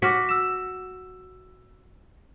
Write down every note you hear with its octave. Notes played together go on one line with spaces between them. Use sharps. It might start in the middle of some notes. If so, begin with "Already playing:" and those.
F#4 D6 F6 B6
E6 E7